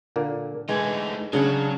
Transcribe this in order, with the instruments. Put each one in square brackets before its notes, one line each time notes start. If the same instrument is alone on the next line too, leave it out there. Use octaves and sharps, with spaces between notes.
[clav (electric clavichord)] A#2 D3 A#3
[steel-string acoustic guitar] D3 E3 [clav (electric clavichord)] G#3 G#5 [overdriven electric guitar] A3 D#4
[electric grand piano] C#3 G#4 [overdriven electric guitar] F#3 [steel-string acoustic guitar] C#4 D4